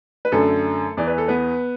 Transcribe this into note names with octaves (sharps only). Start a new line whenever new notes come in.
B4
F#2 D3 A3 A4
E2 E3 D5
B4
A4
B3 B4